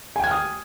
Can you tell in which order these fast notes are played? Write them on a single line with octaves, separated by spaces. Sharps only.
G#5 G5 G#6 F6 D#6